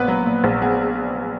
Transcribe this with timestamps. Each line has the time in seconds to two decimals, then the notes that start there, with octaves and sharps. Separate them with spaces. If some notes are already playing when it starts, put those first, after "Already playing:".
Already playing: A#1 A#2 B3 B4
0.08 F#3
0.26 A#2
0.44 A#1
0.61 B3 G#4